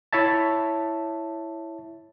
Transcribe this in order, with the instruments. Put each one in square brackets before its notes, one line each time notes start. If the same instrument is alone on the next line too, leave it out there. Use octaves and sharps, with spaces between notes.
[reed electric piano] E4 C#5 E5 A5